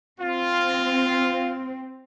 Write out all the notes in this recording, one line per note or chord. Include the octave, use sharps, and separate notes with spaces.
C4 F4